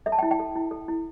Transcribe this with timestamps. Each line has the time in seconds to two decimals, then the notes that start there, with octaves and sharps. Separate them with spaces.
0.06 A4 E5
0.12 A5
0.18 G5
0.23 E4
0.31 G5
0.40 A4
0.56 E4
0.71 A4
0.88 E4